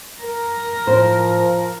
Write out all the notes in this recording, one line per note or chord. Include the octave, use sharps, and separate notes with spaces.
A#4
A2 F3 C5 A#5